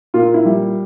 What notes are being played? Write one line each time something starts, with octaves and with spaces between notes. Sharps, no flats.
A#2 F4
E4
G3